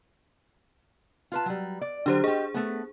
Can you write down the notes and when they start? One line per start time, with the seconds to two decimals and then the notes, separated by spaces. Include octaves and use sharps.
1.32 F4 B4 A5
1.46 F#3 G3
1.81 D5
2.06 D3 F#3 D4 G4 C5
2.24 G4 G#4 D#5
2.54 A3 B3